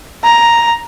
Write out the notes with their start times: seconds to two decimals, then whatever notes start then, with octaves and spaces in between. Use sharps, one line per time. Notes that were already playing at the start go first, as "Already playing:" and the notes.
0.23 A#5